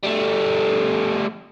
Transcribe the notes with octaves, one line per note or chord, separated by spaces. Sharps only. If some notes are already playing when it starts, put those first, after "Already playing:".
G3 A3